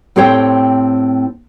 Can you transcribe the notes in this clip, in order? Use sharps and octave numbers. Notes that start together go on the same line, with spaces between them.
A2 C4 G4 C5 C#5 G5